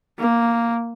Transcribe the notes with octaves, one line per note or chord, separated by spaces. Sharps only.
A#3